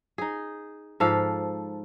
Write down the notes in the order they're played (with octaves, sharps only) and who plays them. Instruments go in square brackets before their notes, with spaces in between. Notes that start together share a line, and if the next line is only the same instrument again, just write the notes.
[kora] D#4 G#4
G#2 F3 A4 F5